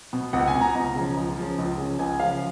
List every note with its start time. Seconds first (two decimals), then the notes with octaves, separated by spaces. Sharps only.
0.13 B2
0.33 C#2 F#5
0.48 G#5
0.54 B2
0.61 A#5
0.75 C#2 A#5
0.96 C#3 F3
1.17 C#2
1.37 C#3 F3
1.58 C#2
1.78 C#3 F3
1.99 C#2 G#5
2.20 C#3 F3 F5